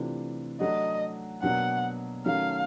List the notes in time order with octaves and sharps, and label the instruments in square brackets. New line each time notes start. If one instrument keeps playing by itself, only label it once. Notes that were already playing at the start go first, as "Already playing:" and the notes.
Already playing: [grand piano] C3 E3 A3 D4 F4
[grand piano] F#3 A3 D4 F#4 [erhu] D#5
[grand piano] B2 F#3 A#3 D4 [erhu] F#5
[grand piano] D#3 F#3 A3 C#4 [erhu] F5